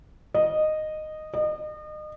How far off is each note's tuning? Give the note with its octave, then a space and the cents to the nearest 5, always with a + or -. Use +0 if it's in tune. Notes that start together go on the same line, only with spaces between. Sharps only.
D#5 -10
D#5 -35